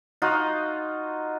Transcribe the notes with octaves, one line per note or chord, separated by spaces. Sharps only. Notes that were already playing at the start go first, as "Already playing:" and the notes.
D#4 F4 F#4 D#5